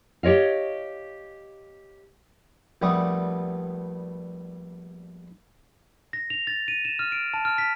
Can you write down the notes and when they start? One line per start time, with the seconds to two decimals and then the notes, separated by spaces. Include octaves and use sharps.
0.23 G4 C#5 D#5 F5
2.82 A#1 G3 A3 B3 D#6
6.13 A#6
6.30 F7
6.47 A6
6.68 D#7
6.85 E7
6.99 F6
7.12 D7
7.34 A5
7.45 F6
7.58 B6